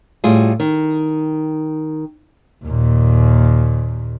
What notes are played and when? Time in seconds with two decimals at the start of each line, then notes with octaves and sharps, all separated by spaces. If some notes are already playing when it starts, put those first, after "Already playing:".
0.24 A2 G3 F4 G#4
0.60 D#3
2.64 D#2 A#2